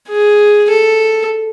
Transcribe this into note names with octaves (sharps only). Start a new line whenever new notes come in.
G#4
A4